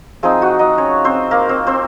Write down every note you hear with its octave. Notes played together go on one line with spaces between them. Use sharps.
F3 C4 D#4 G#4 G#5
F#4 F#5
D#4 D#5
C#4 C#5
C4 C5
A#3 A#4
C4 C5
C4 C5